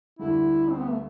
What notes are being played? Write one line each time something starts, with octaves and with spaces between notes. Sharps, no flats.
D2 D3 G3 E4
C4
B3
A3